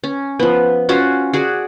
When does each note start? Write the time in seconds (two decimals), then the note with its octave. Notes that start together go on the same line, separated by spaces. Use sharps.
0.04 C#4
0.40 F3 B3
0.89 C#4 F4 F#4 C5
1.33 F#4 G#4 D5